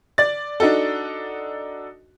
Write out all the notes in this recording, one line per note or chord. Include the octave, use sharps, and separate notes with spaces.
D5 A6
D4 D#4 F#4 A4